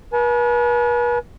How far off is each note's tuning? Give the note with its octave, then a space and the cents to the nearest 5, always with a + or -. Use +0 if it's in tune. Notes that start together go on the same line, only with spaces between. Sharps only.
B4 -40 G#5 +45